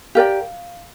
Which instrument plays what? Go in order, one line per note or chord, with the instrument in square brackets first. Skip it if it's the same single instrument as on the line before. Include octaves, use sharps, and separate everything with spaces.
[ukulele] G4 A#4 D5 G5 [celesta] F5